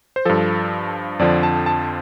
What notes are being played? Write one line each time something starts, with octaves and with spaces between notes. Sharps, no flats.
C5
G2 F3 A4
F2 D3 F3 D5
A5
A5